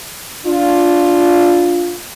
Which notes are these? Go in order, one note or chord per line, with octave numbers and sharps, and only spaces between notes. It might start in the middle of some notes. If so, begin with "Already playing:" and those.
D4 F4